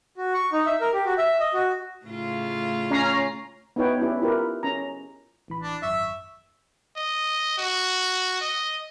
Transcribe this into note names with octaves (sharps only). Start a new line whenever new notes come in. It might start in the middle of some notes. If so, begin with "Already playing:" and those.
F#4
C#6
D#4
E5
A#4
G4
F#4
E5
D#5
F#4
A2 C#3 F4
C#4 A#5 C7
B3 D#4 E4 B4 C#5 G5
C#4 E4 G4 B4 D5
E4 F4 G4 A#4 B4
C#4 A#5
A1 E3 B5
D4
G#1 F#2 E5 C#6
D#5
F#4
D#5